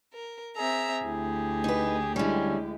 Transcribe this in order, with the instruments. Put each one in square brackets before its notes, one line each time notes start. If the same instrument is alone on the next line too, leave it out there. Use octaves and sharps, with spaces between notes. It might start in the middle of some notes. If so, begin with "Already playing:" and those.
[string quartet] A#4
[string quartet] C4 E5 A#5 [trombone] G#4
[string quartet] D2 G4 [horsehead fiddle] E4
[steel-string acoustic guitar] D#4 B4
[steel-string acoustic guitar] D3 G3 [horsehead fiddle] G#3 E4 [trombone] C#4